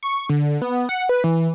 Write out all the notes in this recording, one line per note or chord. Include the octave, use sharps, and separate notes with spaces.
C#6
D3
B3
F#5
B4
E3